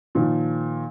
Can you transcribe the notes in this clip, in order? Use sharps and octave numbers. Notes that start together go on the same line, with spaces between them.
A#2 D#3 F3